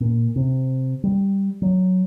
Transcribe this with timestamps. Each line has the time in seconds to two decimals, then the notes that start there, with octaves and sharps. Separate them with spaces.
0.01 A#2
0.36 C3
1.04 G3
1.62 F#3